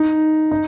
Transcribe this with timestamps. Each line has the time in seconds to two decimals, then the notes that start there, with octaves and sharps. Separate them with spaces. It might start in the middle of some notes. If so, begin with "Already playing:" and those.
Already playing: D#4
0.51 D#4